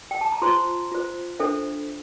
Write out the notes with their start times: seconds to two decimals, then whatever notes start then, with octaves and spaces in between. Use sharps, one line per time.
0.11 G5
0.21 A5
0.32 A#5
0.42 F4 C5 C6
0.91 F4 C5
1.39 D4 A4 C5 E5